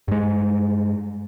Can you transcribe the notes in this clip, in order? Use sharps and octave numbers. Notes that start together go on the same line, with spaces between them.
G2 G#3